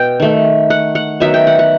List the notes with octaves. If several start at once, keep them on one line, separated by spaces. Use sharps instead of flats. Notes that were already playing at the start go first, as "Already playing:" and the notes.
Already playing: B2 G5
D#3 A3
F#5
F#5
D#3 F#3 B3 E5
G5
F#5
F#5